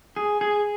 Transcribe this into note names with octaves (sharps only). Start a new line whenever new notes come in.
G#4
G#4